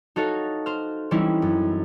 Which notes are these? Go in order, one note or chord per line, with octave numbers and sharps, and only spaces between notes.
D#4 F#4 A4 C#5 F5
C5 F6
E3 G3 C4 C#4 D#4 E4
F#2